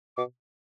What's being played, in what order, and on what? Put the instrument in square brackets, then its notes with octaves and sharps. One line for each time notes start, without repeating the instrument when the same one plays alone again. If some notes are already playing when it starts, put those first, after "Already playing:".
[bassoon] B2 [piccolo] D6